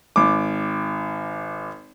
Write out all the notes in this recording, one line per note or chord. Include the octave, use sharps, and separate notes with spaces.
G#1 D6